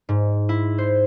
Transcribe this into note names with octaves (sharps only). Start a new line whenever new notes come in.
G#2
E4
C5